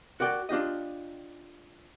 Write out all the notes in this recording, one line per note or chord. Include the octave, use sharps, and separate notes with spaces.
F#4 A#4 D5 G5
D4 F4 G4 D#5